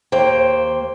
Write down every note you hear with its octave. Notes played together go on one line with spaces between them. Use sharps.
D#2 A#3 C5 G5